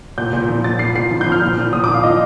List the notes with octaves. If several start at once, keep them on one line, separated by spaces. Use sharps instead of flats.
A#2 G6
A#2
F3
A#2 A6
A#2 C7
A#2 C7
F3
G6
F3
F6
A#2
F3
A#2 D#6
F3 D6
F5
F3 D#5